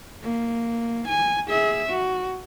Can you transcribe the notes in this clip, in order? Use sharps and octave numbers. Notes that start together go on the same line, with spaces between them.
A#3
G#5
G#4 E5
F#4